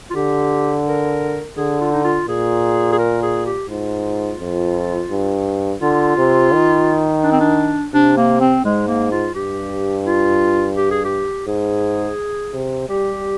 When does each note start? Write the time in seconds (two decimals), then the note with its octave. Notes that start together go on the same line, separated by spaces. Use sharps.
0.10 F4
0.15 D3 G4
0.87 A#4
1.57 D3 G#4
1.81 F4
1.93 D#4
2.04 F4
2.28 A#2 G#4
2.92 G#4
2.99 A#4
3.23 G#4
3.46 G4
3.69 G#2 F4
4.40 F2
5.11 G2
5.82 D3 F4
6.17 C3
6.52 D#3
7.24 D4
7.32 C4
7.40 D4
7.93 C3 D4
8.17 A#3
8.41 C4
8.65 G#2 G#3
8.88 A#3
9.12 F4
9.35 G2 G4
10.06 F4
10.77 G4
10.91 G#4
11.05 G4
11.47 G#2 G#4
12.53 C3
12.89 G3 G4